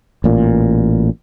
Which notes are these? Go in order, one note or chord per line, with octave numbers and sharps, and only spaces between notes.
A1 A#2